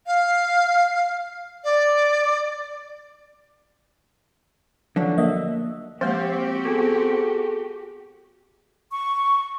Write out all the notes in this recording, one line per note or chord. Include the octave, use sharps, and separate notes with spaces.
F5
D5
D3 F3 F#3
A#3 D#5 E5
F3 G#3 A#3 C4 F#4 G4
B3 G#4 A4
C#6